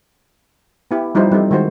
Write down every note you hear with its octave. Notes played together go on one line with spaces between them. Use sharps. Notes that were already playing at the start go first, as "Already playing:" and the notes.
B3 E4 G4
F3 G3 D#4 E4 B4 C5
E3 G3 C4 D#4 A4
D#3 G#3 F#4 C5